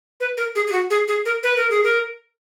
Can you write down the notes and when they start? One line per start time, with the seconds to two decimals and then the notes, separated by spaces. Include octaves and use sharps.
0.20 B4
0.37 A#4
0.55 G#4
0.67 G#4
0.72 F#4
0.90 G#4
1.08 G#4
1.25 A#4
1.43 B4
1.56 A#4
1.70 G#4
1.84 A#4